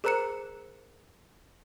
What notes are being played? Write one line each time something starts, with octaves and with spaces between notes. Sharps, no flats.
G#4 A#4 C5 A#5 F#6 C#7